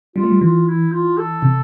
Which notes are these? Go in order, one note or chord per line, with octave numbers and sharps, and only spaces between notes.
G3 F4
A3
G3
E3 F4
E4
F4
A4
C3